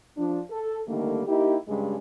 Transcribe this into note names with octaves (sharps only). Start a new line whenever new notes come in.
F3 D4
A4
D3 D#3 G3 A3 A#3
A#3 D#4 E4 G4
G2 C#3 G3 G#3